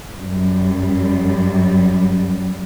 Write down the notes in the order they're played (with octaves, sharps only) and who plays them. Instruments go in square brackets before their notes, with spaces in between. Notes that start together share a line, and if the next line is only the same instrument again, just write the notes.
[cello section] F#2 G3